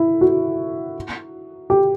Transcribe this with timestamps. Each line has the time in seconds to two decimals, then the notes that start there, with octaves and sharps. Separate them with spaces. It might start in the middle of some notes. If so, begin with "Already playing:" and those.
Already playing: E4
0.21 F#4
1.70 G4